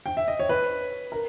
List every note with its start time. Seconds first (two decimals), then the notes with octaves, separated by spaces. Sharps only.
0.06 G5
0.17 E5
0.28 D#5
0.39 C#5
0.49 B4
1.12 A#4